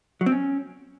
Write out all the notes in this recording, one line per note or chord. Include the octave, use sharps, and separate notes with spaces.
F#3
C4
C#4